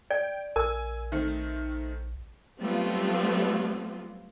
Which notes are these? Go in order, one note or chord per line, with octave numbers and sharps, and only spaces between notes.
D5 G5
A#1 A#4 G#5 E6
D#3 A3 C4
F#3 G3 A3 B3 C4 F4